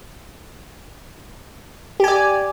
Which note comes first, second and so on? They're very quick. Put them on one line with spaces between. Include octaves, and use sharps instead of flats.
G4 G#5 D5